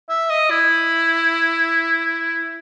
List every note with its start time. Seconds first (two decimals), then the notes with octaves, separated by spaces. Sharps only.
0.09 E5
0.30 D#5
0.50 E4